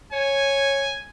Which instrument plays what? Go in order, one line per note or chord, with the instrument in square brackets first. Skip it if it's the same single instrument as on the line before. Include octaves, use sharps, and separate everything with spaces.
[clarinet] C#5 [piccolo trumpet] G#5